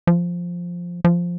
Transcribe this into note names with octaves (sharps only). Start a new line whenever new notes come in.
F3
F3